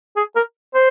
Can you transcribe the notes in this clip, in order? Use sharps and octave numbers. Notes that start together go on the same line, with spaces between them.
G#4
A#4
C5